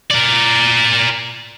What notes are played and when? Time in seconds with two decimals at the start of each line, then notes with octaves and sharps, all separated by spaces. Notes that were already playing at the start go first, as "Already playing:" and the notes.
0.10 A#4 D5